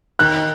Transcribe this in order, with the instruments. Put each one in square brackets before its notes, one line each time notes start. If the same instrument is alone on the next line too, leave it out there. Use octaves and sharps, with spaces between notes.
[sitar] D#3 [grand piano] F#6